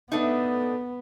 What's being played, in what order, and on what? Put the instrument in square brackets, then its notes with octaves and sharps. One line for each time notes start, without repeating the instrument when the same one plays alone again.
[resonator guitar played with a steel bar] A3 D4 D#4 [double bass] B3